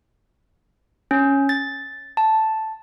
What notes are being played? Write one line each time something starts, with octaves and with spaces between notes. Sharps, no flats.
C#4
A6
A5